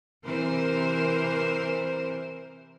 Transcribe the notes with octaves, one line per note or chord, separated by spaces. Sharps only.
C3 E3 A#4 C5